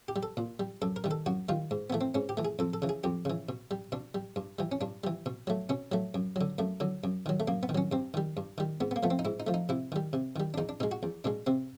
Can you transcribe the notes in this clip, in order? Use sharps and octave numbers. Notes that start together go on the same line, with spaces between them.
G4
G3
A4
A#2
G3
F#2 A4
A#4
D#3 G3
A4
F#2 F#4
D#3 G3 F4
G#2
E3 A3 B3
C4
G#2 C#4
G4
E3 A3
G#4
F2 A4
A4
C#3 E3
G#4
F2 G4
C#3 E3
B2
G3
B2 D4
G3
G2
E3 G3
C#4
G2 D4
E3 G3
B2
F#3 A3
B2 C#4
F#3 A3
F#2
D3 F#3
F#2 A3
D3 F#3
F#2
D#3 F#3
A3
F#2 A#3
B3
D#3
F#3 C#4
G2 C4
D#3 G3
G2
D#3 G3
G#2 B3
B3
A#3
F3 A3 B3
C4
D#4
G#2 E4
D#4
F3 A3
D#4
C3 E4
D#3 G3
C3
D#3 G3
D4
E2 D#4
D4
B2 G#3 D#4
F#4
E2
B2 G#3 D4
C3 C4